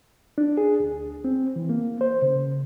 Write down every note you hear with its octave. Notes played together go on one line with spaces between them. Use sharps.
D4
G#4
D2
C4
E3
A#3
C5
C#3